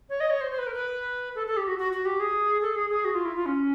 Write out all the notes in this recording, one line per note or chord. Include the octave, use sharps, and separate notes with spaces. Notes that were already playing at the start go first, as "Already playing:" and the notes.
C#5
D#5
C#5
C5
C5
B4
A#4
B4
A4
A4
G4
F#4
F#4
F#4
G4
G#4
A4
G#4
G#4
F#4
F4
E4
F4
C#4